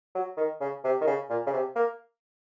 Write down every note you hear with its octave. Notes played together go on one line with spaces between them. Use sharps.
F#3
D#3
C#3
C3
D#3
C#3
A#2
C#3
C3
A#3